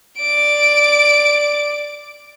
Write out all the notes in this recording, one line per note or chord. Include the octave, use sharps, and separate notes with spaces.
D5 D7